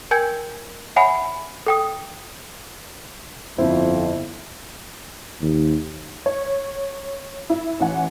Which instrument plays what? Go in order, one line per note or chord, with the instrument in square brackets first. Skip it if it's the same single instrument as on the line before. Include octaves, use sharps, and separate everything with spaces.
[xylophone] A#4 G5 G#5 G6 G#6
C#5 E5 F#5 G#5 B5
A4 G5 D#6
[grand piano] G1 E4 C5 [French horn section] F2
[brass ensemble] D#2
[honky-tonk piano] C#5
E4
A1 E3 F#5 G#5